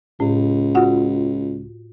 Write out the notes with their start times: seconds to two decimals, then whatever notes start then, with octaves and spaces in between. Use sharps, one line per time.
0.20 C#2 A2
0.75 F4 F#4 F#5